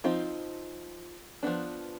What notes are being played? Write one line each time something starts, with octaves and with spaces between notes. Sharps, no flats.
F3 C4 D#4 F4
F3 B3 D4